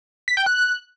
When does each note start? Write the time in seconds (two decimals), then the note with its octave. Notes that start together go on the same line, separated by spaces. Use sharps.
0.28 B6
0.37 G5
0.46 F#6